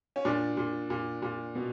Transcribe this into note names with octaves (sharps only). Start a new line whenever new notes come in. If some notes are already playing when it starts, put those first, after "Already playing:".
C#4
A#2 D4
A#2
A#2
A#2
B2